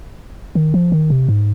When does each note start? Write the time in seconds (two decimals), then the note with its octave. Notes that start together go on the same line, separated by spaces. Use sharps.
0.55 D#3
0.74 F3
0.92 D#3
1.10 C3
1.29 G#2